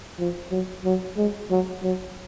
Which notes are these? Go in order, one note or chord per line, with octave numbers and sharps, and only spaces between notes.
F3
F#3
F#3
G#3
F#3
F#3